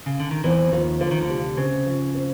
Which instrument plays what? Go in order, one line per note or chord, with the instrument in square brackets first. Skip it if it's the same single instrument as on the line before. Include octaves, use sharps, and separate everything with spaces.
[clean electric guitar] C#3
D3
D#3
[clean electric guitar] E2 E3 [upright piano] C4
[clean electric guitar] D#2 D#3 [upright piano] F3
[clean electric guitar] D3 [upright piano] F3
[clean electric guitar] D#3
D2 D3
[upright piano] C3
[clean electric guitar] C#3 [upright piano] C4
[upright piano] F3
C4